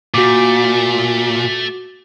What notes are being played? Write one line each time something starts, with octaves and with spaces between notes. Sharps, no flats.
A#2 A3 F#4 D6